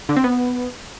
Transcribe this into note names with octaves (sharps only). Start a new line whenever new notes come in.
D3
C4
B3